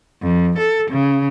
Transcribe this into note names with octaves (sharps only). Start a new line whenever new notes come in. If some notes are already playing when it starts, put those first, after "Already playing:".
F2
A4
C#3